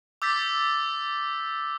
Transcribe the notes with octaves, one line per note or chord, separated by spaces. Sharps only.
D6 E6 G6 A6 B6